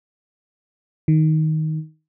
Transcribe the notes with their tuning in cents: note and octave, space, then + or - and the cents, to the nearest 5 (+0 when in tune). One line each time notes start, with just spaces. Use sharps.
D#3 +10